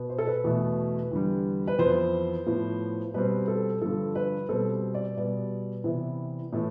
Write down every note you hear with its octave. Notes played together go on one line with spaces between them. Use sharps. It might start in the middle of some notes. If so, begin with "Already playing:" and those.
Already playing: B2 B3
C5
A4
B4
E2 B2 A3
E2 D3 G3
B4
F2 E3 B3 C5
A2 F3 B3
B2 G3 C4 B4
A4
G2 D3 F3 A4
B4
B2 G3 C4 A4
D5
B2 G3 B3 D5
C3 E3 B3
A2 E3 A3